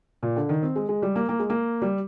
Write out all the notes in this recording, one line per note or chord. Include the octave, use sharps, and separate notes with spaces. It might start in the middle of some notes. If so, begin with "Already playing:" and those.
A#2
D3
D#3
C4
G#3
G#3
G3
A#3
A#3
G#3
A#3
G3